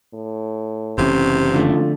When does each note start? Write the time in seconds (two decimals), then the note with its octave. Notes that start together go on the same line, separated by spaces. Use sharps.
0.14 A2
0.98 F#1 C3 E3 C#4
1.52 F2 D3 A3 F4